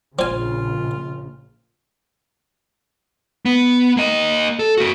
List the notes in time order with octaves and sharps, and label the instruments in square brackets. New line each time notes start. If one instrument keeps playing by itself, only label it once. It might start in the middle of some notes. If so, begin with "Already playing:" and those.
[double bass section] A#1 C#3 [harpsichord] C4 G#5 [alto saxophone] F4
[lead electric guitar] B3
A#3 D#5
A4
A#3 F#4